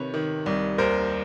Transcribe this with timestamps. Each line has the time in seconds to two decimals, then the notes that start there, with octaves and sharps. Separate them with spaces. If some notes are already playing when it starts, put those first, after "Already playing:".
Already playing: C3 D#3 B4 C#5
0.14 D#3
0.46 C2
0.78 D#2 A#4 C5